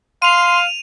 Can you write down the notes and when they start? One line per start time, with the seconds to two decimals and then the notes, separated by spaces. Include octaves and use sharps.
0.22 F5 C6 D#7 F7